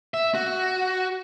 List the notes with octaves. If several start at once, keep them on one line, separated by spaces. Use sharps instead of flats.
E5
F#4